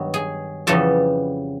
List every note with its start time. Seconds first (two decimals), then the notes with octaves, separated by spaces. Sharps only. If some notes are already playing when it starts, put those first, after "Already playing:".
Already playing: G2 D#3 F#3 B3
0.14 G#4
0.67 F2 C#3 E3 G3 B3 A4